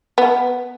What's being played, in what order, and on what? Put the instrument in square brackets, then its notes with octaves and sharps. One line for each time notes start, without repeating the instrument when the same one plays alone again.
[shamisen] B3